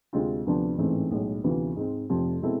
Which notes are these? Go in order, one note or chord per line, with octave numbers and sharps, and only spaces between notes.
D2 C3 G#3 C4 F4
D2 C3 F3 B3 D4
A1 G#2 E3 A3 C4
B1 A2 G#3
D2 C3 E3 B3 F4
G#2 G#3 C4
F1 F2 C3 F3
B2 G#3 C4 E4 A4